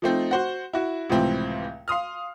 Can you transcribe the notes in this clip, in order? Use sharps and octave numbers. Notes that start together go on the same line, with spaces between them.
F3 A3 C4 D#4
F#4 C5 F#5
E4 F#4
C#2 A2 C3 E3 F3 C4
F5 C6 D#6 F6